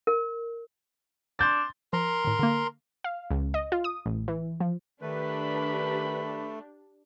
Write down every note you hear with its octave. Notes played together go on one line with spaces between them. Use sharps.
A#4
D4 C6 G6 A6
F3 A#4 A#5 C6
A2 D#3
D3 A#3
F5
C#2
D#5
F4
D#6
A1
E3
F3
D#3 A3 D4 G4 B4 B5